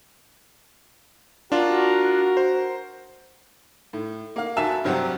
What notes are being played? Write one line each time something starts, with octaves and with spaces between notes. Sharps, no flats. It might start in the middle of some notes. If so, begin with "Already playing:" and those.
D4 F4 F#4 A#4
C5
A2
A#3 F5
D2 F#4 E5 G#5 A5 E7
G2 C3 F#3 G4 C5 F#5